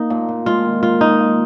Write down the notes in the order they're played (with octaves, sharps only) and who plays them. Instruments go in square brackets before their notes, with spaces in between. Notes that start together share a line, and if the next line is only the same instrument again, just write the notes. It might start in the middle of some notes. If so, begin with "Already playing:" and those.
Already playing: [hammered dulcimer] A#3 [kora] D#4
[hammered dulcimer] A#2
A#2
[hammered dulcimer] G#3 [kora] F4
[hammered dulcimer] D#3
[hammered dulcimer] D#3 [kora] F4
[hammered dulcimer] D#3 [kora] D#4
[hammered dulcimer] A#3